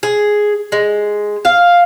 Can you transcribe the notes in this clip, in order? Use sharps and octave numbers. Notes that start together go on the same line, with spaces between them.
G#4
G#3
F5